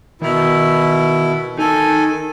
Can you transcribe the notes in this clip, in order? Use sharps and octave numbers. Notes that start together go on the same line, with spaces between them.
B2 D#3 E4 A#5
D#4 A4 A#4 G#5